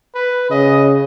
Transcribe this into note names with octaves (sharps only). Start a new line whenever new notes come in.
B4
C#3 D#5